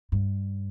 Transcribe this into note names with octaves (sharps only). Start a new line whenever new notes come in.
G2